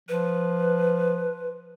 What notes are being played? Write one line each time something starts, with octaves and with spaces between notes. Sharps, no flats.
F3 B4